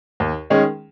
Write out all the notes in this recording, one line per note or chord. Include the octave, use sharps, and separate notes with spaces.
D#2
D#3 G#3 C#4 G#4